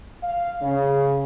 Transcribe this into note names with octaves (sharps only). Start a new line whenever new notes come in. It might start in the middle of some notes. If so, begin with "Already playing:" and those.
F5
C#3